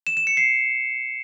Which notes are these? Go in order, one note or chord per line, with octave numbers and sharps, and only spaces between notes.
E7
E7
C#7
C7